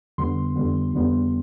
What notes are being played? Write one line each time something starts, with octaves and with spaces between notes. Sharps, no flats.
F2 D3 G3 B3 C6
F2 D3 G3 B3
F2 D3 G3 B3